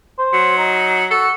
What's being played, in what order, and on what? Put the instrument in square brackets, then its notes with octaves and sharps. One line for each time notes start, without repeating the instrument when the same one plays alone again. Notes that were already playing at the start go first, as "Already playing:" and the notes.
[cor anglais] C5
[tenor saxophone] F#3
[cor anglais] D#4
[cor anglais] F#4 [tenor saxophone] A4